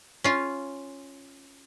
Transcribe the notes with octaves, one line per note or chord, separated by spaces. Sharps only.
C#4 F4